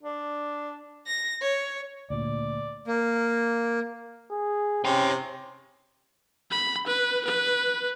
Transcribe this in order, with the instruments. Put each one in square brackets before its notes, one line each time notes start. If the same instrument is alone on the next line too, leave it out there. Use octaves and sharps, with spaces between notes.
[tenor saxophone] D4
[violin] A#6
C#5
[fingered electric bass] D2 A#2 [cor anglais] D5
[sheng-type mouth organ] A#3
[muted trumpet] G#4
[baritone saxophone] C3 [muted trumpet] C#4 [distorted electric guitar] C#5 G5
[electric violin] B5
B4
B4